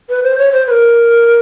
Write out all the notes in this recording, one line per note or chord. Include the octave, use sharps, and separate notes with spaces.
B4
C5
C#5
C5
B4
A#4